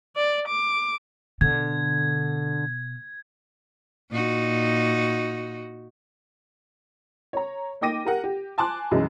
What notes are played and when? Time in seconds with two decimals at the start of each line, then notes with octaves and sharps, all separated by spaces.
0.16 D5
0.48 D6
1.41 B2 D3 G#6
4.10 A#2 D#4 F#4
7.33 C#5 A#5
7.81 A#3 D#4 G5 D6 A#6 D#7
8.05 G4 A#4 F#5
8.24 G4
8.58 G#5 A5 C6 D6 F#6
8.91 B1 F#2 E3 G#3